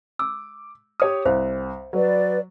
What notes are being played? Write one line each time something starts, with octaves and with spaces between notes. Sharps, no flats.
D6 E6
G4 C#5 D#6
C2 C5 F5
F#3 B4 D5